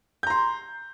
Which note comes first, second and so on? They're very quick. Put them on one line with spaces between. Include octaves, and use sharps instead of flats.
G6 A#5 C6